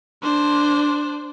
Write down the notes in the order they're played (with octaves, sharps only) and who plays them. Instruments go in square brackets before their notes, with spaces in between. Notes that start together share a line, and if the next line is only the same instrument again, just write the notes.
[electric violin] D4 C5